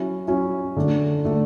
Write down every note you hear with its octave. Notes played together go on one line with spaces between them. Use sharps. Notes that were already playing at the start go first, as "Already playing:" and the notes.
Already playing: F#3 C#4 E4
F#3 C#4 E4
D3 A3 D4
D3 A3 D4